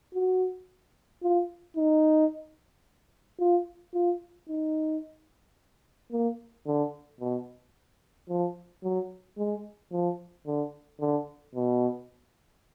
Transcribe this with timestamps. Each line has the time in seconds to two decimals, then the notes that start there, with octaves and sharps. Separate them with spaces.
0.14 F#4
1.23 F4
1.77 D#4
3.40 F4
3.94 F4
4.49 D#4
6.12 A#3
6.67 D3
7.20 B2
8.29 F3
8.83 F#3
9.38 G#3
9.93 F3
10.47 D3
11.01 D3
11.55 B2